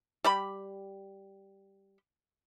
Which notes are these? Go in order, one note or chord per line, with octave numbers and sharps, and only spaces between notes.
G3 G4 B5